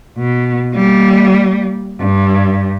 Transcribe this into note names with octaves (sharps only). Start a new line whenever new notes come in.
B2
G3 A#3
G2